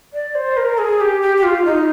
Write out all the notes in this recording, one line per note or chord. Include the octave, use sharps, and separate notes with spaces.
D5
C5
A#4
G#4
G4
G4
G4
F4
D#4